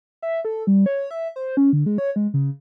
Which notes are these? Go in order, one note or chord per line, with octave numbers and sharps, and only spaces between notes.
E5
A4
G3
C#5
E5
C5
C#4
D3
G#3
C#5
G#3
C#3